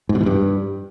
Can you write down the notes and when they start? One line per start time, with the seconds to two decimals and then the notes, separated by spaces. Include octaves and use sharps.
0.09 G#2
0.15 B2
0.21 E3
0.26 G2